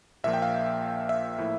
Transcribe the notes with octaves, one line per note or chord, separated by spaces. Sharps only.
A#1 A#2 F3 A#3 E5
G5
F5
E5
A2 F3 A#3 E4